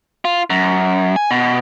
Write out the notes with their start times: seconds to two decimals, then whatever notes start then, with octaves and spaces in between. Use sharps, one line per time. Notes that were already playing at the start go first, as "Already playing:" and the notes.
0.25 F4
0.50 F#2
1.16 G#5
1.31 B2